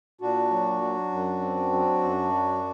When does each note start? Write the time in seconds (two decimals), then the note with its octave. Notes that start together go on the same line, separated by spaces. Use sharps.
0.21 A#2 D4 F#4
0.51 F#3
0.81 F#3
1.11 F#2
1.41 C4
1.72 F#3
2.02 F#2
2.33 F#3